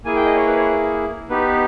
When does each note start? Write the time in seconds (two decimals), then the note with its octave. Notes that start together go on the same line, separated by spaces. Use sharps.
0.05 A#3 E4 G#4 G#5
0.16 G5
0.25 D#5
0.36 C#5
0.47 B4
0.57 C#5
1.29 B3 D#4 G4 B4